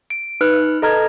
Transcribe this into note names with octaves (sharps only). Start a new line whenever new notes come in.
D7
D#4 B4 F6 F#6
A4 D#5 A#5 F6 G#6